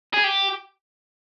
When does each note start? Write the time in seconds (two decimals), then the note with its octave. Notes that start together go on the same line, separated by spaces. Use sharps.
0.14 G#4
0.24 G4